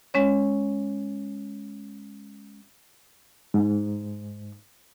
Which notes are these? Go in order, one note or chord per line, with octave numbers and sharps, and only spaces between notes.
G#3 C#4 C#5
G#2